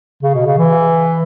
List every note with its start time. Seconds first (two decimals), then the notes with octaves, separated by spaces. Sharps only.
0.23 C#3
0.35 B2
0.46 C#3
0.58 E3